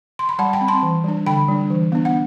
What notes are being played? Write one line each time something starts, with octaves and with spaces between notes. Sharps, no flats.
C6
B5
G3 F#5 A5
G5 B5
C4
A5 C6
E3
G3 D4
D3 G5 B5
G3 D4
E3
B3 D4
F#5